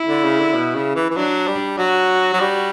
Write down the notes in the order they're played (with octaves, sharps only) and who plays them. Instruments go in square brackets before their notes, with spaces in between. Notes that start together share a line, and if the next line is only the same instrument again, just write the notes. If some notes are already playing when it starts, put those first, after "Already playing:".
Already playing: [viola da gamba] E4
[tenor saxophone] D3
C#3
D3
B2
C#3
E3
E3
[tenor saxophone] F#3 [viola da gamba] D4
[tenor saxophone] G3
[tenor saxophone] F#3 [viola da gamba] F#4
[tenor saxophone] F#3
G3